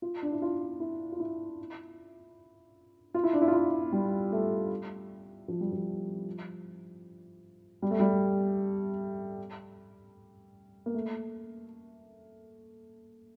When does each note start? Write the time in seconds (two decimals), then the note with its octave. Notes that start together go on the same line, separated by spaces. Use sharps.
0.02 F4
0.22 D4
0.32 E4
0.42 F4
0.80 E4
1.12 F4
1.20 E4
3.14 F4
3.24 E4
3.33 D4
3.42 E4
3.48 F4
3.53 E4
3.93 G3
4.32 A3
5.48 F3
5.61 G3
5.72 F3
7.82 G3
7.91 A3
8.00 G3
10.86 A#3
10.94 A3